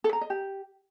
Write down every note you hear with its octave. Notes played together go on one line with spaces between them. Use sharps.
A4
A#5
D#5
G4